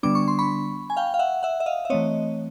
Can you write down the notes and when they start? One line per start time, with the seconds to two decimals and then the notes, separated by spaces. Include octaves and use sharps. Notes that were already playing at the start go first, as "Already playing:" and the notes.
0.03 D3 G3 B3 D4 D6
0.15 C#6
0.28 C6
0.39 B5 C#6
0.90 G#5
0.97 F5 G5
1.14 F5
1.19 E5 F#5
1.43 E5 F#5
1.60 E5
1.66 D#5 F5
1.85 E5
1.90 E3 A3 C4 C#5 D#5